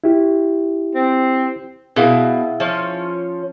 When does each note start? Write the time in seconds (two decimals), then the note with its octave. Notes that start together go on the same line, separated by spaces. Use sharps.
0.04 E4 G4
0.95 C4
1.96 B2 E4 G#4 F5
2.60 F3 C#4 C#5